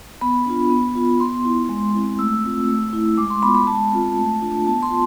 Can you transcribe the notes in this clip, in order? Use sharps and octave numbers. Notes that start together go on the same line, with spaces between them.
B3 B5
D4 F4
B3
F4
B3 C6
E4
G#3
C4 E4
A3 E6
C4 F4
A3
E4
G#3 D6
C6
B3 F4 B5
B5
G#3 A5
C4 F4
A3
D4 F4
B3 A5
C6
F4